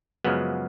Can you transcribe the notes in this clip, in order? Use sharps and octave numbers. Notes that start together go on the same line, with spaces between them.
F#2 C#3 F3 G#3 B3